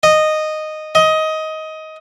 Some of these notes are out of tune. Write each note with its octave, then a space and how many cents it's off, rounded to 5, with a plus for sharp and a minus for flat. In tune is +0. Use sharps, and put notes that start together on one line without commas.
D#5 -10
D#5 +15